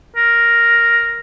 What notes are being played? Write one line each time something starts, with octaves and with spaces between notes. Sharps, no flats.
A#4